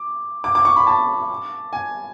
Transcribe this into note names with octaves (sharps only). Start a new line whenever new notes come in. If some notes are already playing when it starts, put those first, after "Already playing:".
Already playing: D6
D6
D6
C#6
B5
A5
G#5